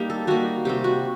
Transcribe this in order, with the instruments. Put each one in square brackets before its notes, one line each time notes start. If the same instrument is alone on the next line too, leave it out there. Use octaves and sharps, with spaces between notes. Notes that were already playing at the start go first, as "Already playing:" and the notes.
Already playing: [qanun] G3 A#3 D#4 G4
A4
G3 A#3 D#4 F#4
C3 G3 C4 G4
F#4